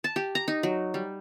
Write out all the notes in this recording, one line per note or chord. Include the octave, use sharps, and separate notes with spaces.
A5
G4
A#5
D#4
F#3
G3